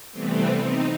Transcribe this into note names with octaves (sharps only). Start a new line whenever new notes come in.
C3 E3 G3 A3 B3 C4
C4 D#4